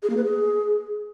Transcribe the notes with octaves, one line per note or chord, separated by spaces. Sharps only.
G#4
A#3
B4
G#4